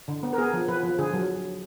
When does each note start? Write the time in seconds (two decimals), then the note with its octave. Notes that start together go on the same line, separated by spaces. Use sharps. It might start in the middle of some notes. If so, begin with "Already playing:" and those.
0.08 D3
0.23 B3
0.33 A#4
0.38 B3 G#4
0.53 F3
0.68 F3 B4
0.83 F3
0.99 D3 G#4
1.14 F#3